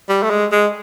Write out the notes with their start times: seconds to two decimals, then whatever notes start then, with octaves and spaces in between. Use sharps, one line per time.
0.09 G3
0.23 A3
0.30 G#3
0.52 G#3